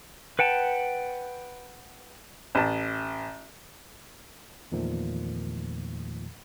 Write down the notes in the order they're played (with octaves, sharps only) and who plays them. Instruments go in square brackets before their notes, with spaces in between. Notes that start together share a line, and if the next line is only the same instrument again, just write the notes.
[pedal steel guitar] B4 F#5 G5 A5
[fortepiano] A1 A5
[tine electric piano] E2 A#2 D#3 F3 A3